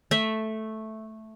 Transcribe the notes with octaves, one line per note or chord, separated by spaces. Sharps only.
A3 E5